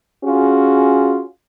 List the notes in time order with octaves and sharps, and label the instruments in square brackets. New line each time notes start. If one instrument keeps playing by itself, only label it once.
[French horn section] C#4 F4 F#4 G#4